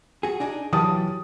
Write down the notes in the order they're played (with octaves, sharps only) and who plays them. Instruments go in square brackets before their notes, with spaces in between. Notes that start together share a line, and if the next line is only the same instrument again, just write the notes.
[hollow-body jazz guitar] F#4 G#4
D4 D#4 G#4
[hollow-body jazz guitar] E3 F#3 G4 [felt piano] A5 D#6